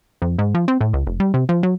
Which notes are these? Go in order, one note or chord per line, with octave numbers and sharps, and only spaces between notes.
F2
G#2
F3
C4
A2
C#2
F1
G3
C3
F3
F#3